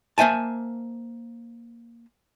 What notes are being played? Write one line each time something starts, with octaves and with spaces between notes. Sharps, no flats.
A#3 C5 E5 G#5 A5